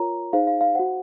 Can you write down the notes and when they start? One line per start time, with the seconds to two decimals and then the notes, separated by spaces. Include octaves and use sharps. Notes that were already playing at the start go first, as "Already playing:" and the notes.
Already playing: F4 A#4 C#5 A#5
0.33 D#4 G#4 C5 F5
0.47 F5
0.61 F5
0.75 F#4 C5 F#5